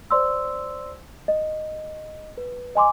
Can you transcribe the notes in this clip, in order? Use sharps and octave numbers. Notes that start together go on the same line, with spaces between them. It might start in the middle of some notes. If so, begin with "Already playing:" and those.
C5 D5 C6 E6
D#5
B4
D#5 G#5 C6 D6